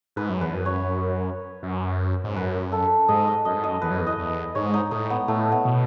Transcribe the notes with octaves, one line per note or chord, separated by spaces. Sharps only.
G#2 B4
F#2
E2 B4
F#2
C#5
F#2
G#2
F#2 B4
A4
G#2 D#5
D#5
F#2 D#5
G#2
F#2 D#5
E2 B4
F#2
E2
D#5
E2
G#2 C#5
D#4
A2 D#4
B3
A2 A3
B3
B2